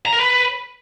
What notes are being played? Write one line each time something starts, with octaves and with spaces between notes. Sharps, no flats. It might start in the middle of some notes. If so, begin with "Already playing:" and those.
A#5
A#4
B4